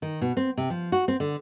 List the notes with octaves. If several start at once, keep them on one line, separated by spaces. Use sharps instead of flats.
D#3
B2
C4
C3
F3
F#4
C4
D3